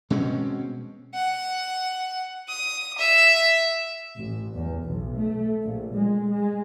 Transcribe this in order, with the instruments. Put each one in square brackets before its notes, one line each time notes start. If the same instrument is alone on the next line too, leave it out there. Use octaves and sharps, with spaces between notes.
[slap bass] B2 G#3 C4 C#4
[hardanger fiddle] F#5
D#6
E5
[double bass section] A1
E2
B1
A3
A#1
G#3
G#3